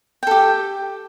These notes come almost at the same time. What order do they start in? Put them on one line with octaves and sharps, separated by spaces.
G5 A4 G4